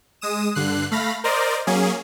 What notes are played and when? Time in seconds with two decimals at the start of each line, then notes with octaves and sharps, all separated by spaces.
0.21 G#3 D#6 E7
0.55 G2 D3 F#6 C7
0.91 A3 F5 B5 A#6
1.24 A#4 C5 D5 D#5
1.67 F#3 A#3 C#4 G#4